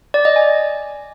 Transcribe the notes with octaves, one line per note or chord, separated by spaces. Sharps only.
D5
D#5
G#5